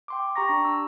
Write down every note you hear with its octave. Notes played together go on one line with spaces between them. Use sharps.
G5 C6 D6
G4 G5 A#5 C#6 A#6
D4
E6